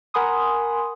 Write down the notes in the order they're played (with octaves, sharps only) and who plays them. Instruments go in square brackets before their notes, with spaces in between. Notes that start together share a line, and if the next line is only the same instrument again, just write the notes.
[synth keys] A#4 F#5 G#5 B5 C6 D#6